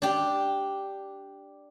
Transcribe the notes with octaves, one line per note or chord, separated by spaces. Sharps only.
D4 G4